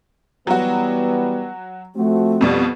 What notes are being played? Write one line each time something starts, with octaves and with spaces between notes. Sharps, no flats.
E3 F#3 G3 B3 F#4
F3 A3 C4 F#4
F2 B2 G3